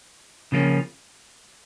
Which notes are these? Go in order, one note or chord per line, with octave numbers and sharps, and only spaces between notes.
C#3 F3 A#3 C#4